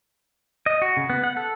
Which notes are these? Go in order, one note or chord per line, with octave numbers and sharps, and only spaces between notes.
D#5
F#4
C#3
B3
F#5
A4